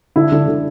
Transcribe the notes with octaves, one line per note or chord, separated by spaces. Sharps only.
D3 E4
D3
D3